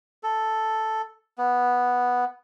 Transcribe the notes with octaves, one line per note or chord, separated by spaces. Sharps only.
A4
B3